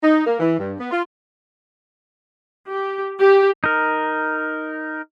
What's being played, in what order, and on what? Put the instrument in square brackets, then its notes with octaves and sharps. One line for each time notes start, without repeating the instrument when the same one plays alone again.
[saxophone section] D#4
A#3
E3
G2
B3
F4
[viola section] G4
G4
[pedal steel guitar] D#4 A#4